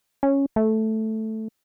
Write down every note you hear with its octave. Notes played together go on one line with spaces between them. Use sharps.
C#4
A3